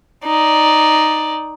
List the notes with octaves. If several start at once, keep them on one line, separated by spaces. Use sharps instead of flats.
D#4 D5